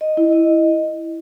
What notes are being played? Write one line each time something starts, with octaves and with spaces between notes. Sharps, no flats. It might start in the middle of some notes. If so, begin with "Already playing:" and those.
D#5
E4
D#5